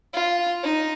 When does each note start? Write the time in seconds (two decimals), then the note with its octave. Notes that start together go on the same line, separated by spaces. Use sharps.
0.13 F4
0.63 D#4